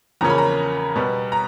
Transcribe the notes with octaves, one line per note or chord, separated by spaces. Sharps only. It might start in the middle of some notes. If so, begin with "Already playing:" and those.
E2 C#3 F3 A#3 C#4 A#5
B5
A#5
B2 G3 B3
A#5